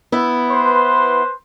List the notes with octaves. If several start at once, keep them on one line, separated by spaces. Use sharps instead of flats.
B3 E4
B4 C5 C6